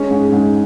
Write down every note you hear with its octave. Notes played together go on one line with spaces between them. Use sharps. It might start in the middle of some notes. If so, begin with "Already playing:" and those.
Already playing: G#3 C#4
G#2
G#2